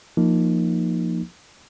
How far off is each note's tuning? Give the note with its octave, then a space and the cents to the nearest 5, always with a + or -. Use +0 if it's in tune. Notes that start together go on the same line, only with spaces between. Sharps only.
F3 +0 A#3 +0 D#4 +0